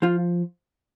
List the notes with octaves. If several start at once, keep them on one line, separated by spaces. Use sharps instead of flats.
F3 F4